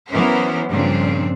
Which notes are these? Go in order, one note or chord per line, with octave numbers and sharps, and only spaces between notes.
E3 F#3 B3 C#4 A#4 C5
G2 A#2 C#3 F3 C4 D4